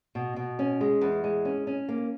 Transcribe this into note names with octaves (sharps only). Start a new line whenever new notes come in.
B2
B2
C#4
G#3
E2
G#3
C#4
C#4
A#3